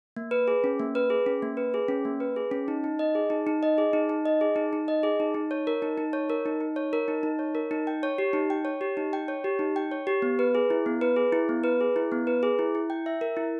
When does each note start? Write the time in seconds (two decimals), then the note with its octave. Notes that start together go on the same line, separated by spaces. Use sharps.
0.16 A#3
0.31 B4
0.48 G#4
0.64 C#4
0.80 A#3
0.95 B4
1.10 G#4
1.26 C#4
1.42 A#3
1.57 B4
1.74 G#4
1.88 C#4
2.05 A#3
2.20 B4
2.36 G#4
2.51 C#4
2.68 D#4
2.84 D#4
2.99 D#5
3.15 G#4
3.30 D#4
3.47 D#4
3.63 D#5
3.78 G#4
3.93 D#4
4.09 D#4
4.26 D#5
4.41 G#4
4.56 D#4
4.73 D#4
4.88 D#5
5.03 G#4
5.20 D#4
5.34 D#4
5.51 C#5
5.67 A#4
5.82 D#4
5.98 D#4
6.13 C#5
6.30 A#4
6.46 D#4
6.60 D#4
6.76 C#5
6.93 A#4
7.08 D#4
7.23 D#4
7.39 C#5
7.55 A#4
7.71 D#4
7.87 G5
8.03 C#5
8.18 G4
8.33 D#4
8.50 G5
8.65 C#5
8.81 G4
8.97 D#4
9.13 G5
9.28 C#5
9.44 G4
9.59 D#4
9.76 G5
9.91 C#5
10.07 G4
10.22 B3
10.39 B4
10.55 G#4
10.70 E4
10.86 B3
11.01 B4
11.16 G#4
11.32 E4
11.49 B3
11.64 B4
11.80 G#4
11.96 E4
12.12 B3
12.27 B4
12.43 G#4
12.59 E4
12.75 E4
12.90 G5
13.06 E5
13.21 A#4
13.37 E4